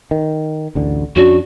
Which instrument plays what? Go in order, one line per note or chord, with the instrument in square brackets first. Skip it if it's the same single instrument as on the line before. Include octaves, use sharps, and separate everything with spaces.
[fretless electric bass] D#3
A1 D2 D3
[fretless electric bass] F2 C#4 D4 [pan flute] F#4